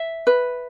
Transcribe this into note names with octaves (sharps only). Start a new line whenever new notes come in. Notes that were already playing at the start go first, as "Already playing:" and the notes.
Already playing: E5
B4